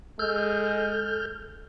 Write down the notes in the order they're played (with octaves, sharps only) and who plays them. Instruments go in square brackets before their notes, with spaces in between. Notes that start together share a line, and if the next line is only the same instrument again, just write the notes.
[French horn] G#3 [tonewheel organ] A4 F6 G6